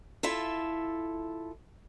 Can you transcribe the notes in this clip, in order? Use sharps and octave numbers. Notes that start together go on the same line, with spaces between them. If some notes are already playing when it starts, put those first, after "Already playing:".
E4 F4 A4 E5